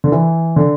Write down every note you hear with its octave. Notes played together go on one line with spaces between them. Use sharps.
D3
E3
D3